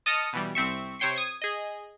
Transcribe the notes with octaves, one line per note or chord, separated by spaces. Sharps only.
D#5 A5 D#6 F6 C#7
B2 E3 G3
C2 C4 E5 C#6
C3 C5 C#5 G5 C7 C#7
D#6 G#6
G#4 D#5